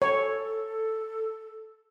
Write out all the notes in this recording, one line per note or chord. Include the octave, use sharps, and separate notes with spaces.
A4 C#5